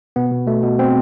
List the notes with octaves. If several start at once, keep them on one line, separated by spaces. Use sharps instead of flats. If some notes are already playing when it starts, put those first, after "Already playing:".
B2 B3
B2
B2 A3
B2
B2 C4